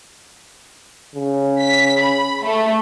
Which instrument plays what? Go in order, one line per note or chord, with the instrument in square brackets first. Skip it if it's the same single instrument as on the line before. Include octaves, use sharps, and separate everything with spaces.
[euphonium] C#3
[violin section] B6
B5
A3